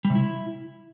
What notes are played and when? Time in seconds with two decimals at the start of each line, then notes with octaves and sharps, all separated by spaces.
0.05 G3
0.10 C3
0.15 E4